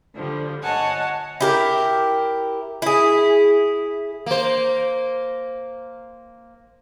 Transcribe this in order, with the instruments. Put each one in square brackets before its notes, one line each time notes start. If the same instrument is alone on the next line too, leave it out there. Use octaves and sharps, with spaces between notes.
[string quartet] D3 F3 G3
C#5 D#5 F#5 G#5 A5
[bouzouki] E4 G4 A#4
E4 G#4
[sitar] A#3 C5